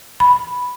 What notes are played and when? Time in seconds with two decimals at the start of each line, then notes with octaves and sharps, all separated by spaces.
0.20 B5